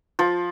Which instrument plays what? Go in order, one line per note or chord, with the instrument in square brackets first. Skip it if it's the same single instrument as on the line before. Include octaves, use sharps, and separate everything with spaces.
[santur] F3